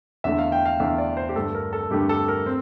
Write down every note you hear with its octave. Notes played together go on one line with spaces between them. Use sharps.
E2 D3 A3 E5
F5
G5
F5
E2 D3 A3 E5
D5
C5
G4
G2 D3 A3 A4
A#4
A4
G2 D3 A3 G4
A4
A#4
C4